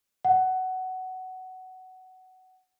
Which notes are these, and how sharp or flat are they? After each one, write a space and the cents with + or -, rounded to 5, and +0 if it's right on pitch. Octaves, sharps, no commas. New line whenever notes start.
F#5 +15